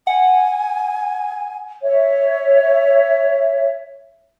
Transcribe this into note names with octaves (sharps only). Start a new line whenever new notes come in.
F#5 G#5
C#5 E5